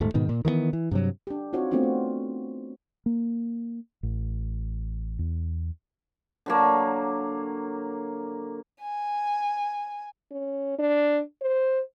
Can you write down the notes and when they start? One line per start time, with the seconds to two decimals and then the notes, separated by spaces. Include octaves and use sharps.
0.01 D#1 G#2 A3
0.14 G#2 B2 D#3
0.29 A#2
0.45 D#3 E3 A3 B3
0.73 E3
0.91 G2 C3 F#3
1.27 D4 G4
1.53 C4 D#4 F4 F#4 C#5
1.71 A3 B3 C4 D4 F4 F#4
1.83 A3
3.06 A#3
4.03 A1
5.19 E2
6.46 D3 F#3 A#3
8.82 G#5
10.31 C#4
10.79 D4
11.42 C5